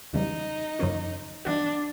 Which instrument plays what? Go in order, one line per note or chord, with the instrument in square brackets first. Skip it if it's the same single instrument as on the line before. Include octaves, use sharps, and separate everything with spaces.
[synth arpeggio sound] E2 C#3 E3 G3 [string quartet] D#4
[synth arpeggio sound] F#2 C#3 F3 A#3 C#4
[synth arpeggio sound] E3 G3 B3 D#4 F#4 [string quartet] D4